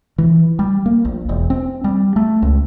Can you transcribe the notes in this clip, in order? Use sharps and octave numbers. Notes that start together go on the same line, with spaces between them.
E3
G3
A#3
A#1
E1
C4
G3
A3
C#2